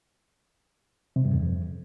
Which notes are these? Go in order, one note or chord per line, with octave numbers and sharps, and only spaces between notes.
C3
G2
E2
F2